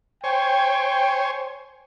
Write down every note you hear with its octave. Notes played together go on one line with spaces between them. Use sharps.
C5 C#5 G5 G#5